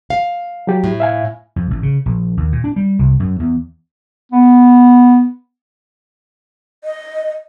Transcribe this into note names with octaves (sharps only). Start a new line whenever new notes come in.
F5
F#3 G4
A2
E5 F5 G#5
F2
A1
C#3
A#1
D#2
A#2
D4
G3
C2
F#2
E2
B3
D#5